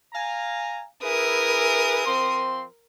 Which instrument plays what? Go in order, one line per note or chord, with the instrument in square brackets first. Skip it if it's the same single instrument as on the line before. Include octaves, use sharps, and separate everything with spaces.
[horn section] F5 G#5 A#5
[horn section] E4 G#4 B4 [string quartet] A#4 D#6
[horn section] F3 C4 C6